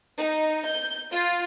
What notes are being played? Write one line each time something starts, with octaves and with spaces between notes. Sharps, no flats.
D#4
G6
F4